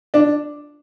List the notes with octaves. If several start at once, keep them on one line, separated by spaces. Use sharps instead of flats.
D4